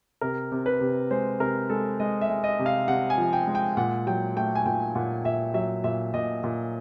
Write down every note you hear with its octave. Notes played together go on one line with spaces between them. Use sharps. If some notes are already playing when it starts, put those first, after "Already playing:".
C3 A#4
C3
B4
C3
G#3 C5
C3 A#4
G#3 A4
G#3 D#5
E5
G#3
D#5
C3
F5
C3 F#5
G#5
F3
G5
G#3
G5
A#2 F#5
F#3 G5
A3 G5
G#5
A#2 G5
A#2 F#5
A#2 E5
F#3 E5
A#2 E5
A#2 D#5
A#2